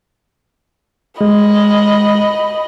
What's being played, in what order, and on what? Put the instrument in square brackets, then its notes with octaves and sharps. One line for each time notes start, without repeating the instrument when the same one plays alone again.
[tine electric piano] G#3 [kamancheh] D#5 B5